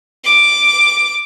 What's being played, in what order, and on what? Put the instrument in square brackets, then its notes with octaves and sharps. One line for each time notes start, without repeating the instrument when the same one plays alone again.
[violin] D6